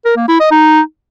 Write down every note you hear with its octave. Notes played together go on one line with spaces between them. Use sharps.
A#4
A#3
E4
D#5
D#4